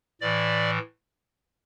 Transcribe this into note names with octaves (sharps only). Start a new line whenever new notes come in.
A2 E3 D5